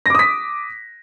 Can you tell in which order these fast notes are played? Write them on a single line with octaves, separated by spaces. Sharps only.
A#6 D6 D#6 B6